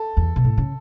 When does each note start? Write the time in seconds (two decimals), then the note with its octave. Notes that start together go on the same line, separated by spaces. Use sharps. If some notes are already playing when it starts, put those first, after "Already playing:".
Already playing: A4
0.17 E2
0.36 B2
0.45 A2
0.58 C#3